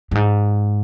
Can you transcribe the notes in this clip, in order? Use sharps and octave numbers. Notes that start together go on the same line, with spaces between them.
G2
G#2